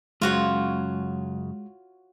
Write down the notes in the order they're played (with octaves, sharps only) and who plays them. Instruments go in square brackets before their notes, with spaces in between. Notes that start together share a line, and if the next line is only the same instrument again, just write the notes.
[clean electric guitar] F#2 C#3 [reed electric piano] G#3 [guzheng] F4 F#4 C#5